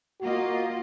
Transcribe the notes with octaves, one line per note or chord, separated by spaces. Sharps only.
A#3 F4 F#4 D#5